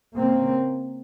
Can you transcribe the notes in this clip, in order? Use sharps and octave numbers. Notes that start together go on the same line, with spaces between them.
C#3 A#3 C4